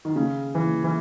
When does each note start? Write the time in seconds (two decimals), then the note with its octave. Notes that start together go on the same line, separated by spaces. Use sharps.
0.05 D#3
0.16 C#3
0.55 E3
0.84 E3